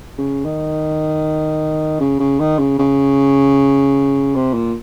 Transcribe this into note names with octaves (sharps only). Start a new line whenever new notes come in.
C#3
D#3
C#3
C#3
D#3
C#3
C#3
C3
A#2